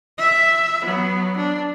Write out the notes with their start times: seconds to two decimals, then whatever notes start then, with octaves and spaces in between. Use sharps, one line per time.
0.19 E5
0.84 F#3 B3
1.36 D4